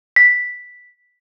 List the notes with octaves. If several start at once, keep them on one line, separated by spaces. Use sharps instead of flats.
B6